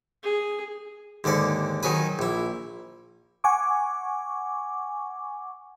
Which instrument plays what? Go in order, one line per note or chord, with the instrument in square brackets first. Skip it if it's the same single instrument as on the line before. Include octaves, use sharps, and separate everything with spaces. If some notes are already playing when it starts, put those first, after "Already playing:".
[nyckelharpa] G#4
[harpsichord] D#2 G#2 D3 D5
D#3 F#3 G#4 B4
A#1 E4
[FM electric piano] F#5 G#5 C#6 D6